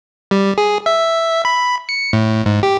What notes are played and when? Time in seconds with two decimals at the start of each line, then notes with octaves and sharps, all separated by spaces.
0.31 G3
0.58 G#4
0.86 E5
1.45 B5
1.89 C#7
2.13 A2
2.46 G#2
2.63 G4